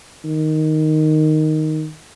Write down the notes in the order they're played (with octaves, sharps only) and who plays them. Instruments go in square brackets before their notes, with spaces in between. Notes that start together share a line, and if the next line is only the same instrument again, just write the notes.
[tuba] D#3